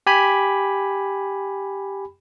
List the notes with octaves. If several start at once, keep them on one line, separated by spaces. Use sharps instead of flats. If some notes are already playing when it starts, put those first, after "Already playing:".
G4 G#5 B5